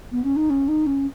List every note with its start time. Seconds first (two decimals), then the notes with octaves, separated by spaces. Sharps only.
0.12 B3
0.24 C#4
0.36 D#4
0.50 C#4
0.68 D#4
0.86 C#4